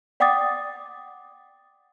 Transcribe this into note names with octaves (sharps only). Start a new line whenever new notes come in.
D5 F#5 G5 D6 D#6 A6